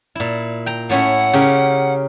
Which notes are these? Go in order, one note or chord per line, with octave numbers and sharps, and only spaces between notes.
A#2 E4
G5 A#5
A2 C#4 E4 F#5
C#3 G4 A#4